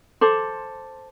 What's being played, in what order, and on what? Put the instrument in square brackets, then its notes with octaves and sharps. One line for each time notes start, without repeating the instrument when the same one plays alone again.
[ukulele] A4 C5 [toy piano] C6 D6